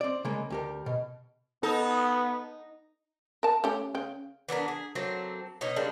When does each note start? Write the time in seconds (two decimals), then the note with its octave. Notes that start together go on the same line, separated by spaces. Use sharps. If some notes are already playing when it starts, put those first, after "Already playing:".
0.01 C4 D5
0.25 C#3 G#3 A#3
0.50 D2 G4 A#4
0.86 B2
1.63 B3 D#4 A4
3.43 A#4 A5
3.64 A3 C#4 G4
3.95 C#3 G5
4.49 E3 B3 D4 A#4
4.68 G#4
4.95 F#3 A3 A#3 C4
5.61 B2 D#4 C#5 D#5
5.76 G3 G#3 A#3 D4